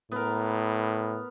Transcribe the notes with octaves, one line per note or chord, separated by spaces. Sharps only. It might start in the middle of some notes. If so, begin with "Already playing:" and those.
A2 B3 A#4